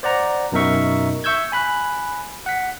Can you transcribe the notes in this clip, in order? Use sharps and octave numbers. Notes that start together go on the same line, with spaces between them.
C5 D5 F#5 A#5
F#2 B2 D#4 A#4 E5 C#6
E5 C#6 E6 G6 G#6
G#5 B5 F#6
F#5 B6